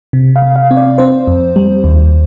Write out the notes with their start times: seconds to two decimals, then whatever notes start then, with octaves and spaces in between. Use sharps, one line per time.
0.13 C3
0.36 F5
0.42 C3
0.56 F5
0.71 C4
0.77 D5
0.98 C4 C5
1.27 F2
1.56 G3
1.84 D#2